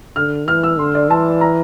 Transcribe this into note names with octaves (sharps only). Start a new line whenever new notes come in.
D3 F6
E3 F6
E6
D3 C6
D5
E3 A5
A#5